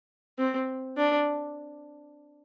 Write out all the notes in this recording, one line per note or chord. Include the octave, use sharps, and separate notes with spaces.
C4
D4